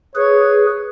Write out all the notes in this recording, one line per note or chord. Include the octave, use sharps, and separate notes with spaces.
G#4 B4 C#5